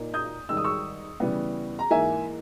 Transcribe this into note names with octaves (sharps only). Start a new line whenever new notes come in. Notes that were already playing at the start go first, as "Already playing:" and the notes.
Already playing: A#2 A#3 D#4
D#6 G6
G#2 D#3 G3 E6
D#6
C#6 E6
C#3 E3 G3 B3
A#5
G#2 E3 A#3 E5 G#5